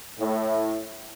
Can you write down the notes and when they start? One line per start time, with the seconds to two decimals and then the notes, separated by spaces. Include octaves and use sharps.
0.18 A2